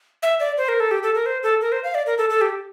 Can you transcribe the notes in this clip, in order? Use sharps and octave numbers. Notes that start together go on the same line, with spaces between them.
E5
D5
C5
A#4
A4
G4
A4
A#4
C5
A4
A#4
C5
F5
D5
A#4
A4
A4
G4